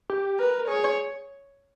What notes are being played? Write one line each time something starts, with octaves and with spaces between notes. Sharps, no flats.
G4
A#4 B4
G#4 C#5